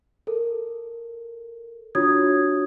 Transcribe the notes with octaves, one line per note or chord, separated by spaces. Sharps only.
A4 A#4
D4 F4 F#4 C#5 D#6 G#6